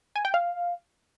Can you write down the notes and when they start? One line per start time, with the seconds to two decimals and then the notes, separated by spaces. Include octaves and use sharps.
0.16 G#5
0.25 G5
0.34 F5